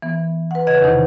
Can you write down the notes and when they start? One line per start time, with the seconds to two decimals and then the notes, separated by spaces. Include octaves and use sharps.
0.02 E3 B3
0.51 B4 F#5
0.67 C#3 B4 D#5 F#5 G#6
0.80 E2 C3 D#3 D#4